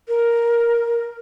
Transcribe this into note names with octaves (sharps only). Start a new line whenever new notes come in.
A#4